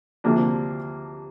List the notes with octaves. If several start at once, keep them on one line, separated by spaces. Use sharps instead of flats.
D2 C3 F3 A#3 D4